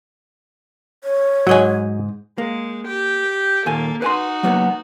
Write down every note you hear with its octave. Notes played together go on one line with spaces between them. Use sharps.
C#5
G#2 F#3 D#5 G#5
G#3 A#3
G4 G5
D#2 A#2 A#3 A4 G#5
D#4 F#4 B4 G#5 C6
F#3 A#3 B3